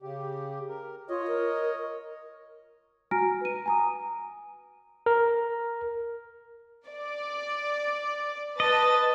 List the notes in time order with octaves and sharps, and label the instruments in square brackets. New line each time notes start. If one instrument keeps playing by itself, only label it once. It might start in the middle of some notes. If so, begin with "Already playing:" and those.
[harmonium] C#3 G4
A#4
[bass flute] F4 [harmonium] C#5 D#5
[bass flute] A#4
[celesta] F#4 G#5 A#5 F6 A#6 D7
B4 D#7
G#5 A#5 D#6
[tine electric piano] A#4
[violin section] D5
[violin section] B4 A5 A6 [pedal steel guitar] D#5